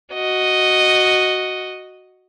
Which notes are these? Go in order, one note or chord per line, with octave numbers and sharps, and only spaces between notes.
F#4 D#5